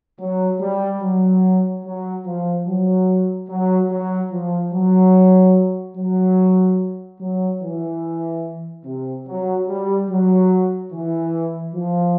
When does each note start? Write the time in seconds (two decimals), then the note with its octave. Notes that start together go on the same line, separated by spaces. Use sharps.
0.19 F#3
0.60 G3
1.01 F#3
1.84 F#3
2.25 F3
2.67 F#3
3.49 F#3
3.90 F#3
4.31 F3
4.72 F#3
5.96 F#3
7.20 F#3
7.61 E3
8.85 C3
9.26 F#3
9.68 G3
10.09 F#3
10.91 E3
11.74 F3